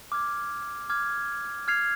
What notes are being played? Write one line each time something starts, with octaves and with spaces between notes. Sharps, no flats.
D6 F6 G#6
D6 F6 G#6
F6 G#6 C7 F7